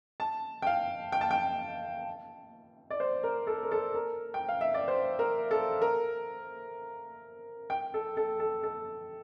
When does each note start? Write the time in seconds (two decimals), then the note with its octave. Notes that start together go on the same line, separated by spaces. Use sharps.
0.20 A5
0.62 G5
0.67 F5
1.12 G5
1.21 A5
1.31 G5
2.90 D5
3.00 C5
3.23 A#4
3.47 A4
3.63 A#4
3.71 A4
3.95 A#4
4.34 G5
4.49 F5
4.61 E5
4.74 D5
4.88 C5
5.19 A#4
5.51 A4
5.82 A#4
7.70 G5
7.94 A4
8.17 A4
8.40 A4
8.63 A4